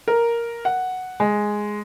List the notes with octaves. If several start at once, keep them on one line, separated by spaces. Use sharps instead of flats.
A#4
F#5
G#3